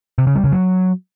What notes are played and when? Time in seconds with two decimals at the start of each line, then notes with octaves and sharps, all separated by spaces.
0.18 C3
0.27 C#3
0.35 G3
0.44 C#3
0.52 F#3